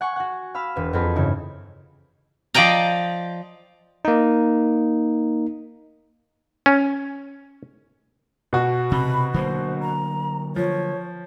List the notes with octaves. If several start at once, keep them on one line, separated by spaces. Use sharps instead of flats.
F#5 G#5 C#6
F#4 F#5
F5 B5 E6 F6
E1 B4
F2 F#3 C4 F4 G#4 B5
G2 C#3 D#4 E4
F3 D5 D#5 G5 A#5
A#3 D#4
C#4
B2 F#4
C3 B5
D3 F#3 A#3 C5
A#5
F3 C#5